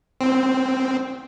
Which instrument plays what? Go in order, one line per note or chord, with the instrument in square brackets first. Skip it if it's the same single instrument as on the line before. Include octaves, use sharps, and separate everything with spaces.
[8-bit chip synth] C4